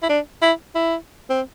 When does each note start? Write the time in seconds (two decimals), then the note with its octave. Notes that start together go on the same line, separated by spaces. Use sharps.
0.03 E4
0.09 D4
0.42 E4
0.75 E4
1.30 C4